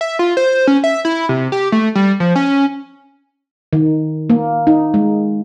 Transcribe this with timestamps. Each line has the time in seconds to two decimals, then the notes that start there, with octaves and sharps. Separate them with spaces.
0.01 E5
0.19 F4
0.37 C5
0.67 C#4
0.84 E5
1.05 E4
1.29 C3
1.52 G4
1.72 A3
1.95 G3
2.20 F3
2.36 C#4
3.73 D#3
4.30 A#3
4.67 D#4
4.94 G#3